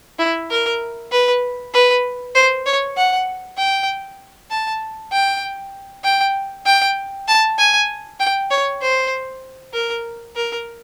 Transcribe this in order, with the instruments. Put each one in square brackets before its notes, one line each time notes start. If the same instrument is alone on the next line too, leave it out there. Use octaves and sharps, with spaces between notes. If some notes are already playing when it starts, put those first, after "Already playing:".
[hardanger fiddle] E4
A#4
B4
B4
C5
C#5
F#5
G5
A5
G5
G5
G5
A5
G#5
G5
C#5
C5
A#4
A#4